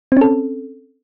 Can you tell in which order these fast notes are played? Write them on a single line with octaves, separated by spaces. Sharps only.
C4 C#4 A4